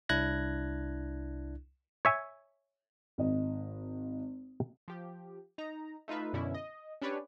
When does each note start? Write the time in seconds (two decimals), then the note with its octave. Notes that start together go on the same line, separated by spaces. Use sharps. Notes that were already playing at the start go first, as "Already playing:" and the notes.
0.09 C2 D4 E4 F#6 G#6 A#6
2.05 C#5 E5 G#5
3.18 G#1 D#5
4.88 F3 G4
5.58 D#4 A#5
6.08 A3 D#4 F4 B4 E5
6.33 F#2 B2 D3 C#4 E4
6.54 D#5
7.02 C#4 D4 G4 B4 C#5 D5